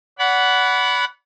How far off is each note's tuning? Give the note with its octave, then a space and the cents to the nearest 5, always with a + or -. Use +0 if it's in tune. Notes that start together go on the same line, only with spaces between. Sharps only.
D5 -45 F#5 +0 B5 +0